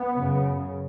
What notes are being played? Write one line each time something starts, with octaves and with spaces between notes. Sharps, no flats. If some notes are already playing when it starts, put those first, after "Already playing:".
Already playing: B3
F#2 C#3